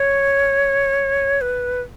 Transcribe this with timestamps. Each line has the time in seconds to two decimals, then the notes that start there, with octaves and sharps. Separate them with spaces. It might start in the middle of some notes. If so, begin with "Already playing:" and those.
Already playing: C#5
1.41 B4